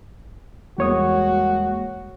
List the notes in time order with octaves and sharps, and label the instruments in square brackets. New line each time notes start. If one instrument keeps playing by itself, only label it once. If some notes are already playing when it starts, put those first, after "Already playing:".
[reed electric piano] E2 C#5 D#6 [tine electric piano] G3 G#3 A#3 [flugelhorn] F#4